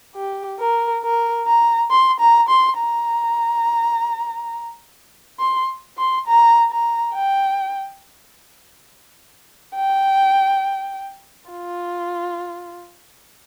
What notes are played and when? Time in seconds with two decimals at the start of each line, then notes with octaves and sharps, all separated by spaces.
0.15 G4
0.60 A#4
1.03 A#4
1.47 A#5
1.91 C6
2.20 A#5
2.49 C6
2.78 A#5
5.39 C6
5.98 C6
6.27 A#5
6.70 A#5
7.14 G5
9.76 G5
11.50 F4